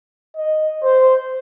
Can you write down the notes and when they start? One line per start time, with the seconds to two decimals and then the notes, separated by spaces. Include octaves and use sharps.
0.37 D#5
0.83 C5